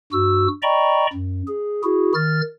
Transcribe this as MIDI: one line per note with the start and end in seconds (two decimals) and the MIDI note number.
0.13 0.48 43
0.13 0.48 66
0.13 0.48 88
0.63 1.07 74
0.63 1.07 75
0.63 1.07 79
0.63 1.07 82
0.63 1.07 83
0.63 1.07 85
1.13 1.42 42
1.47 1.83 68
1.84 2.13 64
1.84 2.13 66
1.84 2.13 68
2.14 2.41 51
2.14 2.41 89
2.14 2.41 93